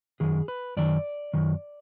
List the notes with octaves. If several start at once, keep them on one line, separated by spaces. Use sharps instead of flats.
F#2 D#3 G#4
B4
F#2 D#3 D5
F#2 D#3